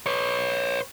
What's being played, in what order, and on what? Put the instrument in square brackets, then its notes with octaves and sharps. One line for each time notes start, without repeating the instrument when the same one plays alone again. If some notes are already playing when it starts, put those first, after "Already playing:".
[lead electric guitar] B4 C#5